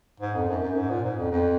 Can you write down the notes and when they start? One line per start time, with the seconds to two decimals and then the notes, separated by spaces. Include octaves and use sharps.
0.21 G#2
0.35 F2
0.48 F#2
0.62 F#2
0.77 G#2
0.90 A#2
1.04 G#2
1.18 F2
1.32 F2